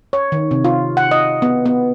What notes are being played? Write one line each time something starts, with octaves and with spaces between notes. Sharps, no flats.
C#5
D#3
C3
F4
F#5
D#5
B3
B3